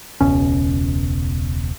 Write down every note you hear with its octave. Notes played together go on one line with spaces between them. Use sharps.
E1 C#2 B2 C#4